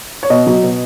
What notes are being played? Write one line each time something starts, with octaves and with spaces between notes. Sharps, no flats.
C#5
B2 D#5
F#3
B2